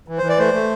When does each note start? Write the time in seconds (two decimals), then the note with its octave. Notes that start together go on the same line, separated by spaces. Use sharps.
0.08 E3
0.18 E3 C5
0.29 D5
0.39 A3 C5
0.53 A3